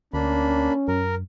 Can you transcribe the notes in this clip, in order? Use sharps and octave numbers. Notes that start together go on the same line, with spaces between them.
D2 A#3 C#4 D4 B5
F#2 A#4